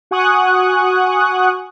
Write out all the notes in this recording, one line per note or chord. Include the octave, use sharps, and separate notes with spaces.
F#4 F#5 G#5 C#6 D#6 F#6